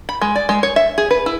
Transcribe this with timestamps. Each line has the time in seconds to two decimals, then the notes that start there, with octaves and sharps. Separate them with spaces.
0.09 B5
0.21 G#3
0.36 D5
0.49 G#3
0.63 C#5
0.76 E5
0.98 G#4
1.11 B4
1.26 E4